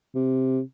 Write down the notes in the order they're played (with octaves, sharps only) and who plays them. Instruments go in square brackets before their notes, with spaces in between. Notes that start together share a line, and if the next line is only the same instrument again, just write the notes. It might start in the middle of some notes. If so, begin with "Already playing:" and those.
[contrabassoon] C3